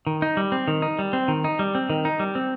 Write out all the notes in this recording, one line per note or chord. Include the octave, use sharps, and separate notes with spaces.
D#3
D#4
G3
C4
D#3
D#4
G3
C4
D#3
D#4
G3
C4
D#3
D#4
G3
C4